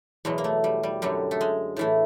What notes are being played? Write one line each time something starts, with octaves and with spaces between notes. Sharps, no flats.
E2 B2 F#3 G#3
A#3
A3
G3
G3
F#2 D3 F#3 G3
A3
G#3
A2 E3 A3